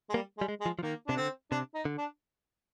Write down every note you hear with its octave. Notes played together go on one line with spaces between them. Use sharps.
G#3
G3 A#3
G#3
G3
G#3
G#3
F3
F3
D#3 A#3
C3 D4
D3 C4
C3 D4
D#4
D3
D4